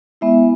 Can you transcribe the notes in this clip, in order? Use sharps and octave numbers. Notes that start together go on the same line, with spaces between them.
G#3 B3 E4 E5